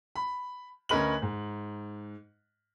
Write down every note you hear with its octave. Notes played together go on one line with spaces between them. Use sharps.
B5
D2 C#4 A#4 B4 D#5 F#7
G#2